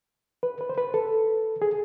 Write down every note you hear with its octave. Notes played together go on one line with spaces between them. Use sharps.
B4
B4
C5
B4
A4
G#4